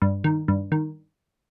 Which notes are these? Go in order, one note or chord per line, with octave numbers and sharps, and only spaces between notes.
G2
D#3
G2
D#3